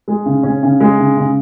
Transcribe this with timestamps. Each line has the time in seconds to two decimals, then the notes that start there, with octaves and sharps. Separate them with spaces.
0.08 G#3
0.26 C#3
0.43 C#4
0.63 C#3
0.80 G#3
0.98 C#3
1.17 C#3